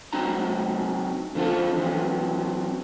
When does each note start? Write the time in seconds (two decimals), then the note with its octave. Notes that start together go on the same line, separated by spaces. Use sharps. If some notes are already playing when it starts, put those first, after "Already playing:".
0.13 F#3 C4 D#4 A#5
1.35 D3 F3 C4 F4 A4
1.77 E3 F#3 C4